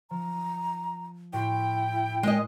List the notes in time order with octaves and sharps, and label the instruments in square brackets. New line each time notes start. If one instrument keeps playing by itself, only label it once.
[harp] F3 [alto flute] A#5
[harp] A2 F#4 C6 [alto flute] E4 [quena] G5
[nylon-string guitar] G#3 D#5 [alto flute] A#4